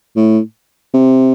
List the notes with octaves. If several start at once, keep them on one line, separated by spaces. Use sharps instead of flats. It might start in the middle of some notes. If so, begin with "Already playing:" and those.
A2
C3